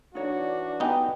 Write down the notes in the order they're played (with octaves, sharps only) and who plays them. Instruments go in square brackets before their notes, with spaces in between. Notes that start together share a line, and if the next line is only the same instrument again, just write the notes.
[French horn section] E3 D4 [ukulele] D#4 C#5 [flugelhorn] F#4
[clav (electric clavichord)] B3 D#4 [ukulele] G4 G5 G#5